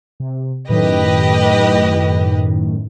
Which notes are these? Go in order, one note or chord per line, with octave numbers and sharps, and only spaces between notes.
C3
F#2 A2 D#3 G4 B4 D#5